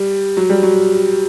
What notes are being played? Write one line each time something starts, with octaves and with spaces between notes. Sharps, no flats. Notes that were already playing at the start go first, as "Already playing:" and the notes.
Already playing: G3
F#3
G3
F#3